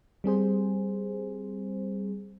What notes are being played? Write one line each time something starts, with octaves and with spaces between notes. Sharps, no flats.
G3 C4 G#4 C5